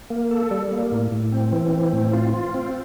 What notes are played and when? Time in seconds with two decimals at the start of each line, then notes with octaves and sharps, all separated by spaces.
0.10 A#3
0.31 A4
0.51 G3
0.71 A#3
0.92 A2
1.12 A2
1.32 C4
1.52 E3
1.73 C4
1.93 A2
2.13 F4
2.34 F4
2.54 C4